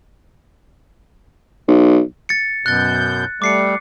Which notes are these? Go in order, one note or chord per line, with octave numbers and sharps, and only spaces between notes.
B1
A6 C#7
F#2 B2 F#6 G6 A6
G3 A3 D6 C7 C#7